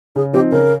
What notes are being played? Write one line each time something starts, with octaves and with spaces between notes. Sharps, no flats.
C#3 G#4
F3 C4 D#4 G4
C#3 A#4